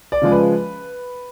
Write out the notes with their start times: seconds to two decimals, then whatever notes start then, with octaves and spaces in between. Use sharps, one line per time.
0.12 D5
0.22 C#3 F3 G#3
0.32 B4